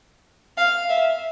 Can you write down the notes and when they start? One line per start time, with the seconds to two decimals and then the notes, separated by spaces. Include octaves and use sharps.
0.57 F5
0.89 E5